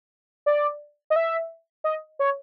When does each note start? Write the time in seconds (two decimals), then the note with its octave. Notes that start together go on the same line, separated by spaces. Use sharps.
0.46 D5
1.10 D#5
1.16 E5
1.84 D#5
2.19 C#5